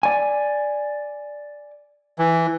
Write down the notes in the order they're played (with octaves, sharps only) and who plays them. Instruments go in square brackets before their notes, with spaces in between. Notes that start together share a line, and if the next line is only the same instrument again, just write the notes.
[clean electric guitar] D5 G#5
[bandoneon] E3